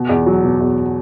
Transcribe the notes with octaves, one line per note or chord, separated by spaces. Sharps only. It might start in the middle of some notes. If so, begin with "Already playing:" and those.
Already playing: B2
E2
F#3
B2
E2